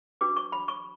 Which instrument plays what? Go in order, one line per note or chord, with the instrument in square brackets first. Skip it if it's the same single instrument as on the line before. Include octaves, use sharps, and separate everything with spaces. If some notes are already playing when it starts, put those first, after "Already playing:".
[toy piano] D4 F#4 B4 D6
C#6
B5
C#6